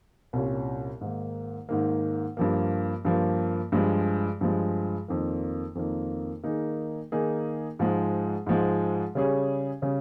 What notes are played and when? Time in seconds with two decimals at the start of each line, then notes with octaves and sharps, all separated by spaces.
0.33 C2 A#2 G3 C#4 F4
1.01 G#2 D#3 A#3
1.69 G#2 D#3 A#3
2.37 G2 F3 A#3
3.05 G2 F3 A#3
3.72 G2 F3 G#3
4.41 G2 F3 G#3
5.08 F2 D#3 A#3
5.75 F2 D#3 A#3
6.43 D#3 A#3 D#4 G#4
7.12 D#3 A#3 D#4 G#4
7.79 G#2 F3 G#3
8.47 G#2 F3 G#3
9.15 C#3 G3 C#4 G#4
9.82 C#3 G3 C#4 G#4